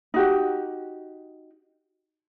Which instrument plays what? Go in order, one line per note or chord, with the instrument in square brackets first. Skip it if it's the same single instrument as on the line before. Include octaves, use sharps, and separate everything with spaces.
[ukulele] D#4 F#4 G4